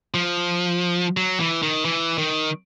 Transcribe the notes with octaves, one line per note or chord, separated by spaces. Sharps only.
F3
F#3
E3
D#3
E3
D#3